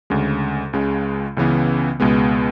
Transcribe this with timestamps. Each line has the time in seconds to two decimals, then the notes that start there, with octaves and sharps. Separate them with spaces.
0.10 D2 C#3 G#3
0.73 C#2 C#3 G#3
1.37 C#2 C#3 E3 B3
2.00 C#2 B2 G#3 B3